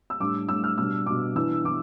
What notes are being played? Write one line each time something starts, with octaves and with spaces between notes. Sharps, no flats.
E6
A2 G3 D4 D6
A2 G3 D4 E6
F6
B2 G3 D4 E6
B2 G3 D4 D6
E3 B3 D4 E6
E3 B3 D6